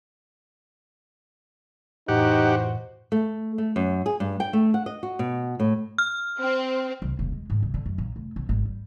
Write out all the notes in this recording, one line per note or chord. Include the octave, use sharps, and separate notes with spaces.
F2 A2 E3 D#4 F#4 G4 C5 F#5
A3
A3
F#2
G#4
G2
G5
A3
F#5
D#5
F#4
B2
A2
F6
C4
C2
E1
G#3
G#2
C2
D3
F#2
A#1
F1
B1
G#1
G3